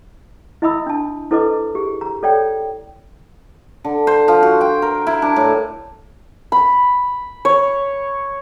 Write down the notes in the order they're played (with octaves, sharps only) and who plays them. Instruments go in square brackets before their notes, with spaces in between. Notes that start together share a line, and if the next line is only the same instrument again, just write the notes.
[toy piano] E4 D#5 E5 B5 D#6 E6
D4 A5
E4 A4 B4 C5 D#5 D6
G4 G#4
A#5
A4 C#5 D5 G5
[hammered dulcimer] D3
C5
F3
F#4
G5
A#4
E4
D4
A2
[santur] B5
C#5